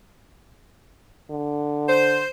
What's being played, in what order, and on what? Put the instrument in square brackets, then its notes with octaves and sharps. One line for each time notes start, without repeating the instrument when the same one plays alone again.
[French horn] D3
[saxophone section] C5